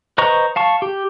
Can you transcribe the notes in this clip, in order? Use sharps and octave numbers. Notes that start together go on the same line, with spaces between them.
B4 C5 D#5 A#5 C#6
F5 A5 C#6
G4